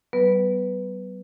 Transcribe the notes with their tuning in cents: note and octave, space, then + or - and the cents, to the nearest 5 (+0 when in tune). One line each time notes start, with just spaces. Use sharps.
F#3 +45 B3 +0 B4 +0